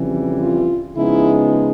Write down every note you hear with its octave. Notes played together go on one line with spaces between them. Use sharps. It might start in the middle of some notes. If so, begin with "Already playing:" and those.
Already playing: F2 C#3 E3 G3
F4
C#3 F3 G#3 B3 D#4 E4